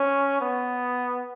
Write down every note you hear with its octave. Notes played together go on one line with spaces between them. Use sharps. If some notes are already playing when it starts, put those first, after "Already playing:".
Already playing: C#4
B3